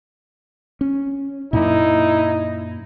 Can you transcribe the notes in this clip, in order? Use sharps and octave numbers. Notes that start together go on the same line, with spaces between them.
C#4
F#2 A#2 D#4 E4